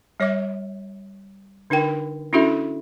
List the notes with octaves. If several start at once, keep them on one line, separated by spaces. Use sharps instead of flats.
G3 C#5 E5 D6
D3 D4 D#4 A#4 G5
C#4 D4 E4 F#4 A4 E5